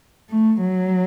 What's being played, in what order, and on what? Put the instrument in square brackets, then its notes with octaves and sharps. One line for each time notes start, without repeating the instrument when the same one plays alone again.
[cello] A3
F#3